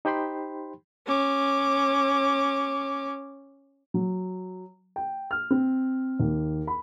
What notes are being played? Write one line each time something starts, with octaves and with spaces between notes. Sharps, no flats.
D#4 G4 C5 G5 B5 C6
C#4 D6
F#3
G5
F6
C4
D#2
B5